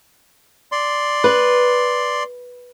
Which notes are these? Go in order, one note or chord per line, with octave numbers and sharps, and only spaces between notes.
D5 C6
B4